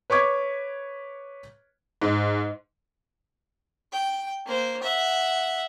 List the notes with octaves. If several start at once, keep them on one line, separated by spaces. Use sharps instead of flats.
B4 C#5 C#6 D6 G#6
G#2
G5
A#3 C5
E5 F#5